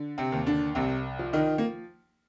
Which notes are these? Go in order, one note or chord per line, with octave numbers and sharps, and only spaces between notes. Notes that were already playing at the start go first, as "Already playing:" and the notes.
Already playing: D3
C3 C4
D#2
D3 D4
C2 C3 C4
F3
D#3 D#4
A#3